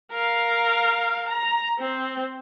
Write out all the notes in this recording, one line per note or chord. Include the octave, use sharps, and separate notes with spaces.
A#4 F5
A#5
C4